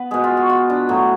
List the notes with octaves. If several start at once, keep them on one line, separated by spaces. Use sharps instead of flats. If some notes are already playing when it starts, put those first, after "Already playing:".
Already playing: B3 B4
B2 G#3 G#4
F4
F#4
F4
D4
A2 F#3